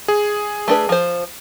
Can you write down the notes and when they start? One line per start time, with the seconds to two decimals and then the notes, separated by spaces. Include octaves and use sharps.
0.08 G#4
0.68 A3 D4 B4
0.89 F3 C5